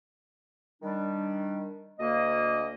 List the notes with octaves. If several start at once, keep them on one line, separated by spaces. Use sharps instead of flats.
D#3 G3 D4
D2 A#3 D#5